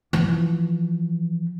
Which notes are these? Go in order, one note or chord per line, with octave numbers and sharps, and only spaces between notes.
E3 F3